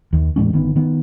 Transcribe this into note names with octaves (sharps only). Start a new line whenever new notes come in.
D#2
E2 A2 G#3 C#4
G1 D#3 B3
D#3 B3